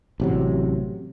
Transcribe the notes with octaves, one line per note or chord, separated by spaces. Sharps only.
A1 C3 F#3